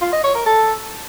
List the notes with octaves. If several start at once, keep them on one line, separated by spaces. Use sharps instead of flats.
F4
D#5
C#5
A#4
A4